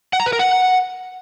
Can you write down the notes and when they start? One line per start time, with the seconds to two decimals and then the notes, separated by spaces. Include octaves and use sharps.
0.13 F#5
0.20 A#5
0.26 B4
0.33 A#4
0.39 F#5